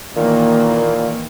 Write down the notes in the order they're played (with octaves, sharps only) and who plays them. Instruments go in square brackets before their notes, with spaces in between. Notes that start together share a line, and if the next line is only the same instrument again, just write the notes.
[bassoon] A#2 [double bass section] D#3 E3 A#3